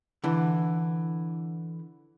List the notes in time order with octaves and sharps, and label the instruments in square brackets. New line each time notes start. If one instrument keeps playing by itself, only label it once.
[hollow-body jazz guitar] D3 E3